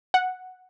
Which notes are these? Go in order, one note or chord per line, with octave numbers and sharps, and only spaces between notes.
F#5